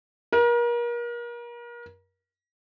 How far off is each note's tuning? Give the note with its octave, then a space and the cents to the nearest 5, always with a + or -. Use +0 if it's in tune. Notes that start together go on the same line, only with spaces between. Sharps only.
A#4 +35